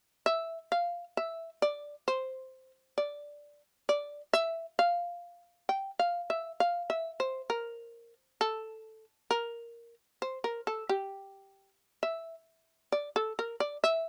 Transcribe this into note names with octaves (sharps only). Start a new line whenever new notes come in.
E5
F5
E5
D5
C5
D5
D5
E5
F5
G5
F5
E5
F5
E5
C5
A#4
A4
A#4
C5
A#4
A4
G4
E5
D5
A4
A#4
D5
E5